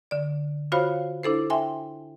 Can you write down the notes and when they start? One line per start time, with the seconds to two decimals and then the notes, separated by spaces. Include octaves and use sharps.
0.11 D3 D5
0.72 F4 F#4 C5 C#5 F5 B5
1.23 D4 E4 A4 C5
1.50 E5 G5 G#5 C6